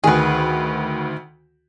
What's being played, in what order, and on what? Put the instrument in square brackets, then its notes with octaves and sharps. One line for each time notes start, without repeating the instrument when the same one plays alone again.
[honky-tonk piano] D2 D#3 [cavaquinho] G#4 B4